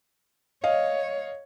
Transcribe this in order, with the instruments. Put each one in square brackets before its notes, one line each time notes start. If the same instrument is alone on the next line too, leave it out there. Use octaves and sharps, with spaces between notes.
[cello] C#5 [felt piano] D#5 F5